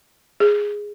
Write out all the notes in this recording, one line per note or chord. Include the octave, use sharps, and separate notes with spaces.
G#4